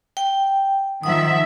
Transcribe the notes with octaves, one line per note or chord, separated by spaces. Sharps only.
G5
D#3 F3 E5 F#5 D#6